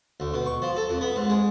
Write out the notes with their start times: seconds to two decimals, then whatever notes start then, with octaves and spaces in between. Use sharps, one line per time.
0.20 D2
0.34 B2
0.46 C#6
0.62 F3
0.77 A4
0.89 F2
1.01 B3
1.16 G#2
1.30 G#3